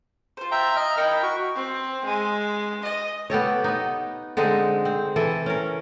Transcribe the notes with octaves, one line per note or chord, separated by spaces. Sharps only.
F4 C5
E5 G5 A#5
D#5 A#5 F6
D#4 E4 A#4 G5
F#4 C#6
C4
G#3
D#5
B3 G4 A4 C#5
B3 D#4
D3 G#3 C4 D#4
C4
E3 A4
C#4 A#4